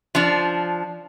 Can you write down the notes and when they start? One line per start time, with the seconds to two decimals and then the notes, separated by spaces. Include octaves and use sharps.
0.15 F3 D4